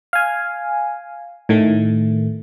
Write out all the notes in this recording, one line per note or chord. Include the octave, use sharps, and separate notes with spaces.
F5 G#5
A2 D#3 A3